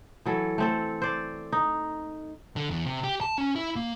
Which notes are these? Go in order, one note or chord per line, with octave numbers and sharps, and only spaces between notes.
E3 F#3 A4
A3 C4 A4
C5 D5
D#4
D3
E2
C3
G4
A5
C#4
E4
A#3